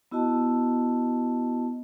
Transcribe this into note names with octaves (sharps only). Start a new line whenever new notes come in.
B3 E4 F#4 D#5 A5